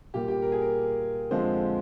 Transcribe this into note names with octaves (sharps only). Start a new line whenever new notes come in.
A#2 G3 A#3 G4
G4
A#4
G#4
A#4
F2 D3 F3 G#3 C5